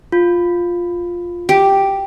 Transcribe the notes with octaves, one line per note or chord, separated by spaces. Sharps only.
F4
G4